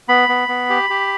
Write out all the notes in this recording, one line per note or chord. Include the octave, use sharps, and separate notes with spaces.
B3 B5
B3
B3
G4
G4